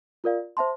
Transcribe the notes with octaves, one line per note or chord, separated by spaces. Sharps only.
F4 A#4 D5 F5
C5 E5 A5 C6